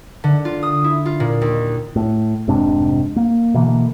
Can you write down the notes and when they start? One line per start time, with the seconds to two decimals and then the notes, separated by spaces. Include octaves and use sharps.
0.24 D3
0.45 F4
0.63 D#6
0.84 E4
1.05 F4
1.20 A#2
1.41 D#2
1.96 A2
2.48 F1 G#2 C3 D4
3.16 A#3
3.54 B2 D3 E3 A#3